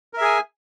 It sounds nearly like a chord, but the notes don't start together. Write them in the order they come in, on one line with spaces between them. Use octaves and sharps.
A#4 E5 G#4 G#5